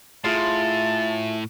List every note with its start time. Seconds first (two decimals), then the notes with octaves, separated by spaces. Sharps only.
0.24 A2 F4 G#4 E5 A5 C6